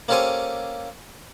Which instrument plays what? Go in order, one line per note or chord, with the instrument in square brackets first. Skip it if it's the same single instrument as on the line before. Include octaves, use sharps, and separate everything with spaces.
[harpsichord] A#3 C#4 G4 A4 C5 G#5